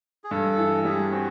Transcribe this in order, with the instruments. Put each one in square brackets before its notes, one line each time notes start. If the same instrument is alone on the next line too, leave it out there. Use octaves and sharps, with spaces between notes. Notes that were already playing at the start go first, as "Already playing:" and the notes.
[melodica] G#4
[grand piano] G2 [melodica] A4
[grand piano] E3
[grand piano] G3 [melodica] G#4
[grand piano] C4 [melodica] F#4